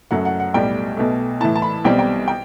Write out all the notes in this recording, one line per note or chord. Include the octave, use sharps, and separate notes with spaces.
F#2 F#3 A3 F#5
F#5
F#5
B1 A2 G3 G5
B1 B2 A3
A2 E3 A3 E4 A5
A5
B5
B1 B2 G3 C4 G5
G5
G5